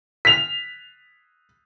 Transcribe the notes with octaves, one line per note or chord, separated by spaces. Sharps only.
B6 F7